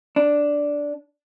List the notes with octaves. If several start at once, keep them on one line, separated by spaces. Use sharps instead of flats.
D4